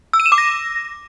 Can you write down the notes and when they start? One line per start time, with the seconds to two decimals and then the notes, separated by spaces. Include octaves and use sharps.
0.13 E6
0.20 D#7
0.26 E7
0.32 D6
0.38 A#6